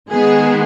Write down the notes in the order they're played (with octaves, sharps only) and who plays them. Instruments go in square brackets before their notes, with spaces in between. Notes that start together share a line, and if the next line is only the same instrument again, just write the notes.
[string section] D#3 G#3 B3 G#4